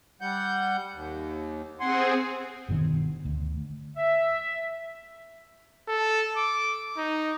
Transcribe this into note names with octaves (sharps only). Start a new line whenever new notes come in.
G3 F#5 G6
D#2
C4 G#4 F#5 G#5 C6
G1 B2 D3 D#3
D2
E5
A4
D6
D#4